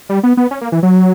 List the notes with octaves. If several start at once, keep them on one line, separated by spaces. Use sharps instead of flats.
G3
B3
B3
C#4
A#3
E3
F#3